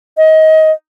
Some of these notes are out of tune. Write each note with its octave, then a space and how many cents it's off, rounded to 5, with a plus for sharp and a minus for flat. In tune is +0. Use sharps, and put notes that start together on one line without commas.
D#5 +25